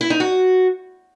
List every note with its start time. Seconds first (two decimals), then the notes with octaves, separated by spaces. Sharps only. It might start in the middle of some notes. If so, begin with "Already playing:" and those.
0.01 E4
0.10 D#4
0.20 F#4